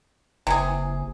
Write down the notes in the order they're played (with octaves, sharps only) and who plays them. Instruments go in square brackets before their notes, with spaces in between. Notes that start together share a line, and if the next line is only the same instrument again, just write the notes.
[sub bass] F#1 [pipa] C3 E3 G#4